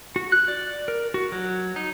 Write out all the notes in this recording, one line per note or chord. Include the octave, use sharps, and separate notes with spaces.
F#4
F#6
D5
A#4
F#4
F#3
D#4